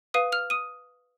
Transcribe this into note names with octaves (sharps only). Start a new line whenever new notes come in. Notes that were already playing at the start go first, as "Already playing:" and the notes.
B4 F5 D#6 D#7
F6 F7
D#6 D#7